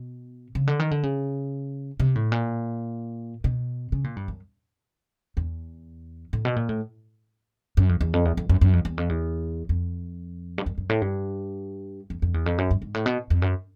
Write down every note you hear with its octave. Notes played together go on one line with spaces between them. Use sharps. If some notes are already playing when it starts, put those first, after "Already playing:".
Already playing: B2
C#3
D3
D#3
D3
C#3
C3
A2
A#2
B2
C#3
A#2
G2
F#2
E2
A2
B2
A#2
A2
F#2
F2
E2
F2
E2
F2
F#2
F#2
F2
E2
F2
E2
F2
G2
F#2
F#2
A2
G2
F2
F2
E2
F2
F#2
G2
G#2
A2
B2
F2
F#2